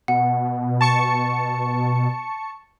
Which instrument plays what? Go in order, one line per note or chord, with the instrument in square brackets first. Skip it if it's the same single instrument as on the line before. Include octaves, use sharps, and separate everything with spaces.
[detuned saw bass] B2 [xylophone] F#5
[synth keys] A5 C#6 C#7